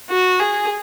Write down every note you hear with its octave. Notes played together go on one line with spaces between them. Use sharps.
F#4
G#4